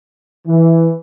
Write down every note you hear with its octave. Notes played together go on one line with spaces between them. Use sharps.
E3